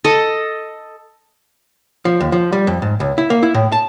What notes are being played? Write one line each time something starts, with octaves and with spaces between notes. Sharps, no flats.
A4 D#5
F3
D#2
F3
G3
F2
G#2
C#2
E4
A#3
E4
A2
A5